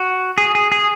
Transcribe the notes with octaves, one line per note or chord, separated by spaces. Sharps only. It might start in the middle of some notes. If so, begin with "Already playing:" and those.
Already playing: F#4
G#4
G#4
G#4